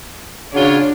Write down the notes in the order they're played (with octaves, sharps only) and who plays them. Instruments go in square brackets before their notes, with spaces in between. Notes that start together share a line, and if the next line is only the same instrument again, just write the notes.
[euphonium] C#3 [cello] D4 [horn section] F4 F#4 C#5